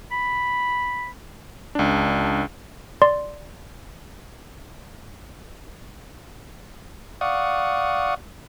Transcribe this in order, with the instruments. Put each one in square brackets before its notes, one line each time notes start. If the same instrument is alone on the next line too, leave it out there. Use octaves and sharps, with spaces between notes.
[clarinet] B5
[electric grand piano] C#2 D4
[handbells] D5 C6
[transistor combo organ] D5 F5 F#5 C#6 D#6